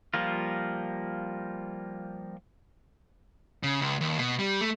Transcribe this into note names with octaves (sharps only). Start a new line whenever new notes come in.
F3 G3 A#3 F4
C#3
C#2
D#2
B2
G3
A3